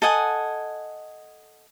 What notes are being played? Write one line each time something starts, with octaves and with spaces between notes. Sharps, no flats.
A4 D#5 F#5 G#5